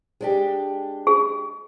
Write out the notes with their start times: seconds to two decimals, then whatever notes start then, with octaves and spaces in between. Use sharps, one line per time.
0.21 G#3 D4 G4
1.07 G#4